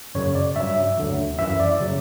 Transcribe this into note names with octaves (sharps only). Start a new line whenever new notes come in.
F#2 C#3 F#3 C#5
D5
G2 F#3 E5
D2 D3 F#3
F#2 E3 E5
D5
C#3 F#3